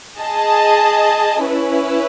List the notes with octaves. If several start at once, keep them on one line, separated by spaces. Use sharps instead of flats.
G#4 D#5 A5
C#4 E4 B4